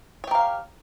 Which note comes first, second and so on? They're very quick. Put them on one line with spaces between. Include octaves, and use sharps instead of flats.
C#5 G4 A#4 F5